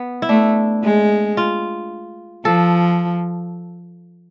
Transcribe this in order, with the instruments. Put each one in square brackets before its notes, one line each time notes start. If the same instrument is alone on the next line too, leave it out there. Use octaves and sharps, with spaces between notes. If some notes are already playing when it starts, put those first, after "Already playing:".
Already playing: [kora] B3
E4
[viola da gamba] A3 [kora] D4
[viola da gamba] G#3
[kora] F4
[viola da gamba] F3 [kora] A4